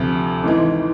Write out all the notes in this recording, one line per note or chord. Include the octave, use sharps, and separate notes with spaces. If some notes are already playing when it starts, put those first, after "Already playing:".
Already playing: D2 C3 F3
G#1 G#2 E3